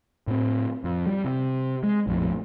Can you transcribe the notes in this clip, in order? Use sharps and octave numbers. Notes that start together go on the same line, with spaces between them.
A2 C4
F2
G3
C3
G#3
A#1 F2 A2